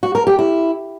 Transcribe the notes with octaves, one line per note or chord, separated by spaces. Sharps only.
F#4
A#4
G4
E4